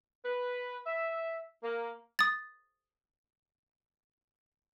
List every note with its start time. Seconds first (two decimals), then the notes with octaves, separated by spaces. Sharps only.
0.24 B4
0.86 E5
1.63 A#3
2.19 D#6 A6